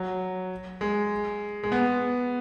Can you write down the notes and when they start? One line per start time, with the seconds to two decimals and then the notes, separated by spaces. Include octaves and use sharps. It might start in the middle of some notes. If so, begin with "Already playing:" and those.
Already playing: F#3
0.81 G#3
1.63 G#3
1.72 B3